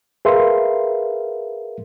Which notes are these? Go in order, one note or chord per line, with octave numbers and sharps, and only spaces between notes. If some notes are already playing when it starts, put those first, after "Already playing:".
G#4 A#4 B4 E5 F5 C6